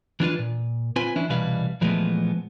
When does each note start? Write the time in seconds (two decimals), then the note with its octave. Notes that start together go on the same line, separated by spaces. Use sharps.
0.20 E3 D4 F4 B4
0.39 A#2
0.96 C4 F4 B4 G#5
1.16 E3 C#4 D4 E4
1.29 C2 B2 E3 G3 B4 F5
1.81 A#2 E3 F3 G#3 A3 B3